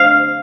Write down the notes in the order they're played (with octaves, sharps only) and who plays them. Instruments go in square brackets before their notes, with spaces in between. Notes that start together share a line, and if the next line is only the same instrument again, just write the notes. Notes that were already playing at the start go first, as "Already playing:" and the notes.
Already playing: [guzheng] F5